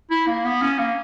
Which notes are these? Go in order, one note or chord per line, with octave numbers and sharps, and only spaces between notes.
E4
A#3
B3
C#4
A#3